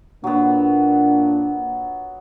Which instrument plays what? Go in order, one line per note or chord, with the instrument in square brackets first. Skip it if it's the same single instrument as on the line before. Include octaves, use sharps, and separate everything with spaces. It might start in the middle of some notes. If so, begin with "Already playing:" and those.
[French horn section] A#2 A#3 D4 [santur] F#3 B3